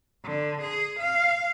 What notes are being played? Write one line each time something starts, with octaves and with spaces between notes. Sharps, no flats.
D3
G#4
F5